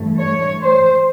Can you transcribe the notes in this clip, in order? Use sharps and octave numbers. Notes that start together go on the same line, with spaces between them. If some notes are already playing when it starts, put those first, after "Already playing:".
Already playing: G2 E3 A3
C#5
C5